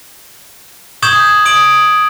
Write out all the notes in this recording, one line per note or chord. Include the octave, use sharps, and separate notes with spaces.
C#6 D#6 G6 G#6 E7 F#7
D#6 D7 F#7